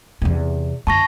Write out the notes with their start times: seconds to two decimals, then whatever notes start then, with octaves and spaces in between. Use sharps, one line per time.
0.22 E2 C3
0.87 F#2 D3 A5 C#6 A#6